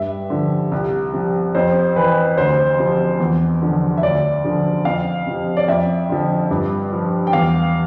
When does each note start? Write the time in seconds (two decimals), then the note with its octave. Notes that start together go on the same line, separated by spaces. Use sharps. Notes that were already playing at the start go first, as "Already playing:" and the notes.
Already playing: G2 E5
0.30 D3 F3
0.72 C2
1.13 C3 F3
1.55 F2 C5
1.96 E3 B4
2.37 D2 C5
2.78 C3 F3
3.20 E2
3.62 D3 F3
3.97 E5
4.03 D2 D5
4.44 D3 F3
4.85 F2 F5
5.26 C3 F3
5.57 D5
5.68 F2 E5
6.09 D3 F3
6.51 G2
6.93 F3
7.27 G5
7.33 E2 F5